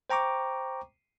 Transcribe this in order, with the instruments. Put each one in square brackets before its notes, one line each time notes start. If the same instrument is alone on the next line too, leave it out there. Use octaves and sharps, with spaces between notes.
[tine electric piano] C5 G5 A#5 C#6 D6